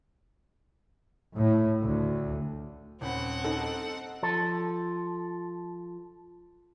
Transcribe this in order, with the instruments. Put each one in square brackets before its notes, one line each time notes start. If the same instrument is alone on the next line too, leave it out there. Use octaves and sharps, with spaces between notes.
[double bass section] A2
D2
[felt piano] D#1 C#4 B5 [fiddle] C4 F#5
[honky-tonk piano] D#4 A4
[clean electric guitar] F3 A4